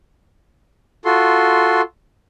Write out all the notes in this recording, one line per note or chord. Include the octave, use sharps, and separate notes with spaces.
F4 F#4 A4 C6